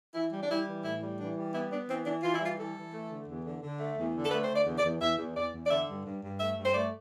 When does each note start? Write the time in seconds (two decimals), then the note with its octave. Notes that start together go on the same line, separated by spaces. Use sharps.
0.15 E3 E4
0.33 G3
0.42 D4
0.50 G3 E4
0.67 E3
0.85 A2 E4
1.02 G3
1.20 E3 D4
1.37 G3
1.54 B3 E4
1.71 B3 D4
1.89 E3 C4
2.06 E3 D4
2.23 E3 F4
2.34 E4
2.41 G3 F4
2.58 E3 A4
2.75 E3
2.93 A3
3.10 D3
3.28 E2
3.45 D3
3.62 D3
3.80 A3
3.97 E2
4.14 D3
4.24 A4
4.31 A3 B4
4.44 C5
4.50 D3
4.55 D5
4.66 E2
4.78 D5
4.84 E2
5.01 E2 E5
5.18 E2
5.36 E2 D5
5.54 E2
5.66 D5
5.70 D3 E5
5.88 G2
6.05 G2
6.23 G2
6.40 A3 E5
6.58 G2
6.66 C5
6.75 A3 D5